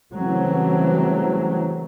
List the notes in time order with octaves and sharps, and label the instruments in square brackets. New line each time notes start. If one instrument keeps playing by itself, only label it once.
[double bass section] C#3 E3 F#3 G3 A3 C4